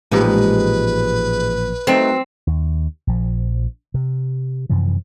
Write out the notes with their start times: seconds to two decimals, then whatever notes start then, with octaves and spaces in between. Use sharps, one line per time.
0.12 A1 A#2 F3 G#3 D#4 G4 B4
1.87 F#3 A3 C4 D#4
2.47 D#2
3.07 A#1 F3
3.94 C3
4.70 F#2 C3 E3 F3